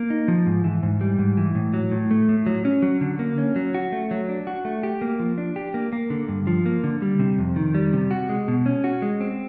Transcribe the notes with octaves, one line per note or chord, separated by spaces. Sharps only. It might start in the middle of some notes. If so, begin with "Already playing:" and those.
Already playing: A#3
D#4
F3
G#2
E3
G#2
G3
G#2
E3
A2
F#3
A2
A3
A2
F#3
C#4
F#3
D3
A#3
C#4
F#3
F#4
A3
F#3
D4
F#4
A3
G4
A#3
F3
D4
G4
A#3
A#3
D3
G2
F3
A#3
D3
G3
C3
F2
D#3
G3
C3
F#4
G#3
B2
C#4
F#4
G#3
C4